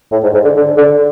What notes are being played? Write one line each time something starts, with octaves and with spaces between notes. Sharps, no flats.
A2
G#2
G#2
D3
D3
D3